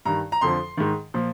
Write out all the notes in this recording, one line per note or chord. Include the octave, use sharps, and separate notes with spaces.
G2 D#3 A#5
A#5
F2 D3 F3 C6
G#2 D#3
A#2 F3